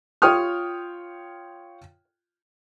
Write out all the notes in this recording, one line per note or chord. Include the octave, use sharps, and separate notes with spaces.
F4 C#5 G5 D#6 F6